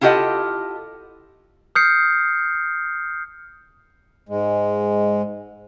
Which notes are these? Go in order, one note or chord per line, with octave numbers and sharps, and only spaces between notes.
E4 F4 G4 A4 D#5 F#5
D#6 F6 G6 C7 C#7
G#2 G#3